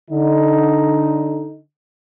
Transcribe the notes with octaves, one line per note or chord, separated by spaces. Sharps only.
D3 D#4